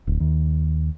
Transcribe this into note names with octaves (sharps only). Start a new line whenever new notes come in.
D1
D#2